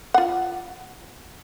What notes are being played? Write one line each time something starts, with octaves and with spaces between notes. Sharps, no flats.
F4 F#5